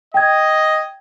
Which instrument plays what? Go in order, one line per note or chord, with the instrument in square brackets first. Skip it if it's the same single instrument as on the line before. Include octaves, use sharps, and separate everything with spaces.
[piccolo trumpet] D#5 [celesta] G5 G#6